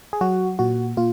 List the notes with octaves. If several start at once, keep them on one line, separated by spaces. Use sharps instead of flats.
G#4
F#3 F#4
A#2 F#4
A#2 F4